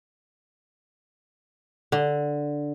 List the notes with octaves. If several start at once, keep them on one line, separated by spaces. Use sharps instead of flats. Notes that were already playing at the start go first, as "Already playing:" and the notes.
D3